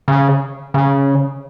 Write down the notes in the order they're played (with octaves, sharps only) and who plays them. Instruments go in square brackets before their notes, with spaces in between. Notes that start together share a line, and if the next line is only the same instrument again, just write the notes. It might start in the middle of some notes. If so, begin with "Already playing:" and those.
[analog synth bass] C#3
C#3